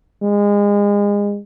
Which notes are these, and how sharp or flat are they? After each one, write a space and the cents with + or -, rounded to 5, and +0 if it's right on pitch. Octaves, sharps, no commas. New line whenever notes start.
G#3 -30